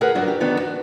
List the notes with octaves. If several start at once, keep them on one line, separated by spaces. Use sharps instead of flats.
D2 G#4 A#4 B4 F#5
G2 F#3 D4 F#4
G4
F2 D3 D#3 B3 D4
F#4